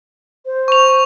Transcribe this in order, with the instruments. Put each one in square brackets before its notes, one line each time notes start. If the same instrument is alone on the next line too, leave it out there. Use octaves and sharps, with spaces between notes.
[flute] C5
[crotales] C#6 F7